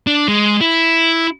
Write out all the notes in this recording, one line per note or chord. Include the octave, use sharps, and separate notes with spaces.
D4
G#3
E4